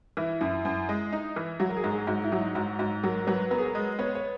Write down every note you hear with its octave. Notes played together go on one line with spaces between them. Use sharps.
E3 E4
F#2 E4
F#2
G#3
D#4
E3
F#3 F#4
A#4
G#4
G#2
G#4
G#2 F#4
E4
F#3
D#4
G#2 F#4
G#2 F#4
F#3 A#4
F#3 B4
B3 A#4
G#4
A#4
G#3
B3 C#5
C#5